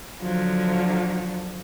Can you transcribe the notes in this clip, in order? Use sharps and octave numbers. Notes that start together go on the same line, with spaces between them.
D3 F3 F#3